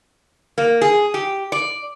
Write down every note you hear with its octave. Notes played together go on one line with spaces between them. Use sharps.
A#3
G#4
G4
D5